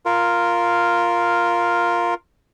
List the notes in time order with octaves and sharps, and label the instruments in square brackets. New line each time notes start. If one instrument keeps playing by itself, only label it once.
[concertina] F4 A#4